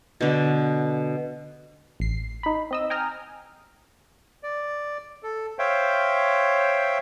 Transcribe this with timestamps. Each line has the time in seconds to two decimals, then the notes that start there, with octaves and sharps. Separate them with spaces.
0.21 B2 D3
2.00 A1 C7
2.43 D#4 B5
2.71 C4 D#5 E6
2.90 G5 G#5 A#5 D#6 F6
4.43 D5
5.23 A4
5.59 C5 C#5 E5 F5 G5